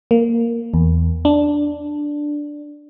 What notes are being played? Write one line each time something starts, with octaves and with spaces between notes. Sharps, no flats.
A#3
E2
D4